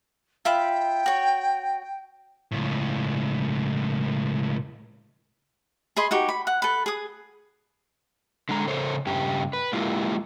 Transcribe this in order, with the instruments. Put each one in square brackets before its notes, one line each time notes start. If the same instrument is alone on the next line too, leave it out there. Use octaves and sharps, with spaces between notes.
[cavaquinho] F4 E5 B5 [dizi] G5
[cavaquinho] F#4 C#5
[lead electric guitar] C#2 A2
[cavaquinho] G#4 D#5 B5 C6
D#4 F#4 G4
B5
F#5
A4 B4
G#4 D#6
[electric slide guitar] D3 G#3 A#5
C#3 A4 C5 C#5
G2 C#3 G4
B4
G#3 A#3 E4 F4 G4